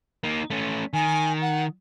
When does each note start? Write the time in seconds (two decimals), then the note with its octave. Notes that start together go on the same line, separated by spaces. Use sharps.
0.24 A#3 D#4
0.50 A3 C#4
0.93 D#3 G#5
1.41 F#5